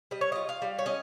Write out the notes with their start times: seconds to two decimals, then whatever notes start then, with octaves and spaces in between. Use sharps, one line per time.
0.11 G3 D#5
0.21 C#5
0.32 F4 D#5
0.49 F5
0.62 G3
0.79 C#5
0.86 C#4 D#5